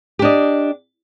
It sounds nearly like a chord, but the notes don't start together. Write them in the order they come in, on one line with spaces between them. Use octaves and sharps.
G4 D4 D#5